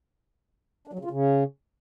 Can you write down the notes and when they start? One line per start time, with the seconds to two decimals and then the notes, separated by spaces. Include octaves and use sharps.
0.87 D4
0.93 F#3
0.99 C#3
1.05 F4
1.10 C#3